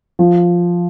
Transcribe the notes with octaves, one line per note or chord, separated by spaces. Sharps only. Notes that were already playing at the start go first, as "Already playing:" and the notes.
F3